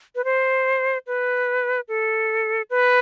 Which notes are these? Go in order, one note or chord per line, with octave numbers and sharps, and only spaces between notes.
B4
C5
B4
A4
B4